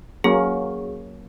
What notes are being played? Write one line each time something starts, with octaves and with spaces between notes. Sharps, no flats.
F#3 A#3 C#4 G#4